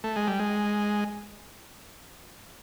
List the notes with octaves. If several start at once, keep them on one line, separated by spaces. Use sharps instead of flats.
A3
G#3
G3
G#3